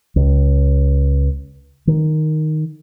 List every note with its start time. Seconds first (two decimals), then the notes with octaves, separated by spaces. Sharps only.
0.16 C#2
1.87 D#3